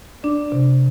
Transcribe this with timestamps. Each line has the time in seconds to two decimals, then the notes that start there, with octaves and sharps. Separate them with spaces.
0.23 D4 D5
0.52 C3